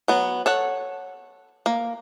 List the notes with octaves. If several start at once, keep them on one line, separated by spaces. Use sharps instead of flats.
F#3 B3
A4 C#5 F#5
A#3